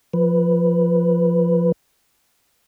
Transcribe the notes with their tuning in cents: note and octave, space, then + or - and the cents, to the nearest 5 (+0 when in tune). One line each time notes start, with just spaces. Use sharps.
F3 +0 B4 +0